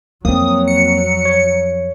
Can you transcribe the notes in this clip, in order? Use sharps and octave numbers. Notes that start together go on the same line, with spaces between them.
F2 F#3 A#3 C4 D#6
C#7
C#5